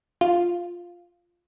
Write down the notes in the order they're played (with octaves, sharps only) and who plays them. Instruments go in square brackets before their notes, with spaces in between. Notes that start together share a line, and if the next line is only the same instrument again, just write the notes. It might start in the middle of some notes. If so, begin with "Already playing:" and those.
[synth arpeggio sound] F4